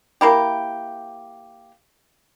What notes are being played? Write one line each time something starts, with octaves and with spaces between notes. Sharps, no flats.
A#3 E4 G4